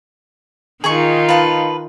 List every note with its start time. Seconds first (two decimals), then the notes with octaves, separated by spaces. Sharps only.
0.84 D#3 D#4 F4 G#4 G#5 C#6
1.29 B4 F5 A5